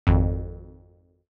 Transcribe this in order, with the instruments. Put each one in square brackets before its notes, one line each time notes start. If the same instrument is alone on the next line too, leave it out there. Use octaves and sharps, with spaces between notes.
[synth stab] G#1 F2